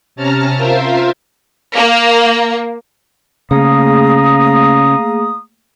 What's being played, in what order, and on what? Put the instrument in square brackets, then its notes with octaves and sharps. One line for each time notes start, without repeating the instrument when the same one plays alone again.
[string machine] C3 C#4 A5 A#5 F6
F4 A#4 C5 E5 F5
[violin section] A#3
[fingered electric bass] C#3 [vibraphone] A3 A#3 G#4 [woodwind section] F5 A#5 D#6